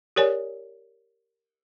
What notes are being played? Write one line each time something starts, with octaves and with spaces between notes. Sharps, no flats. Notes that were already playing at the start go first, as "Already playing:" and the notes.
G4 A#4 C#5 D5 G#5